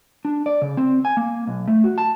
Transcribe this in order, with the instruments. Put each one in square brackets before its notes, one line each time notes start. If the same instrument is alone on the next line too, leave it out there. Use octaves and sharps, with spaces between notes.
[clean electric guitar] D4
D5
C#3
C4
G#5
A#3
B1
A3
F#4
A5